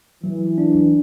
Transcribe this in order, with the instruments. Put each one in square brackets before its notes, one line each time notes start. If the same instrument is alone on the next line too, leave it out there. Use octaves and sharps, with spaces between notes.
[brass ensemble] E3 [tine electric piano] F#3
[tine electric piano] D4